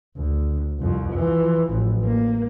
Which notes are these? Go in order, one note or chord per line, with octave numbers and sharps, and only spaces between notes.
D2
C2 F2
E3 F3
A1
A#3